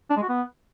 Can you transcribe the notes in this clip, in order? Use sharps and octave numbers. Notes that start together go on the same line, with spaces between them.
D4
G#3
F#4
B3